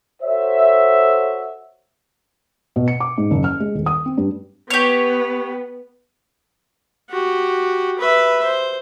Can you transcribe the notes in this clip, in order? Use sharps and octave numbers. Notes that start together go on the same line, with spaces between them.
F#4 A4 C5 C#5 E5
B2
C#7
D6
G#2
F#1
F6
G#3
D#1
D#6
C4
G2
B3 G4 C#5
F#4 G4
B4 E5
C5